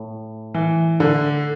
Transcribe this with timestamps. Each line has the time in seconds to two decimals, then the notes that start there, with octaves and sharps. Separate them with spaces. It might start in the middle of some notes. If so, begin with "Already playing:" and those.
Already playing: A2
0.54 E3
1.00 D3